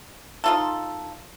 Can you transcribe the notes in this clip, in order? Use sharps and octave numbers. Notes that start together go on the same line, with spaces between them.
D#4 F4 A4